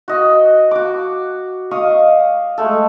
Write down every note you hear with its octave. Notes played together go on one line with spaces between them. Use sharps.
F#4 D#5
F#4 D6
D#5 F5 C#6 D#6
G#3 A3 A4